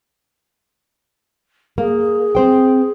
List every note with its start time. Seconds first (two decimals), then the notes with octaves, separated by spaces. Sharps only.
1.78 A#3 G#4
2.35 C4 C5 G5